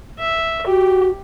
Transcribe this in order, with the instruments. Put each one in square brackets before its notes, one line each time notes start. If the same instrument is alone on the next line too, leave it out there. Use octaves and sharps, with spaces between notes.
[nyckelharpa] E5
[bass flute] F#4 [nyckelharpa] G4